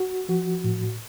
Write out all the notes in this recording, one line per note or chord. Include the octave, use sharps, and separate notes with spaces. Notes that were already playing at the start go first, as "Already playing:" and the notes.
Already playing: F#4
F3 F#4
A2